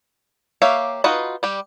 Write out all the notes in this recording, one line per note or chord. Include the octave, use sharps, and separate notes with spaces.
A#3 G4 C#5 E5 F5
D#4 F4 F#4 B4
G3 G4